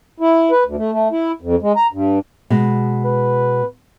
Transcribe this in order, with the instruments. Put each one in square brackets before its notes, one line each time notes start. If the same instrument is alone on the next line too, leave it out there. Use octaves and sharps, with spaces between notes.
[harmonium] E4
B4
D2
A3
A3
E4
F2
G#3
A#5
G2
[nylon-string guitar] B2 G#3
[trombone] B4